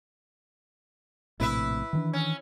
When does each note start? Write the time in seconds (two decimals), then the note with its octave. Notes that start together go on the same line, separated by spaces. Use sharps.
1.40 A#1 A2 C3 E4 B4 E5
1.93 D#3 E3 D4
2.13 C#4